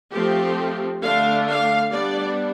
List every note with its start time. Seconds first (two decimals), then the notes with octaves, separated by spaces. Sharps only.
0.13 F3 A3 C4 G4
1.02 D3 A3 D4 F5
1.47 F5
1.91 G3 B3 D4 D5